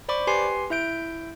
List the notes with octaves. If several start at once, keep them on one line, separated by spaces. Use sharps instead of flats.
C5 D5 B5 C#6 D6
G4 B4 G#5 C6 C7
E4 E5 G6 D7